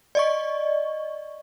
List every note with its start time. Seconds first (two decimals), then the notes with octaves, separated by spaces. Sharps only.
0.15 D5 D#5 C#6